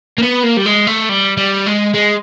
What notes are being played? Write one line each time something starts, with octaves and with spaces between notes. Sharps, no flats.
A#3
B3
A#3
G3
G#3
A3
G3
G3
G#3
G#3